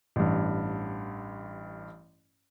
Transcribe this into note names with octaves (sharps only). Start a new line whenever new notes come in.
A1 G2